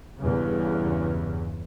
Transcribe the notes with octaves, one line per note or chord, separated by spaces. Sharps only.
E2 G2 C#3